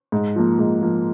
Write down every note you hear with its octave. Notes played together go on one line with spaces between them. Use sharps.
G#2
F3 A#3
G#2
F3 A#3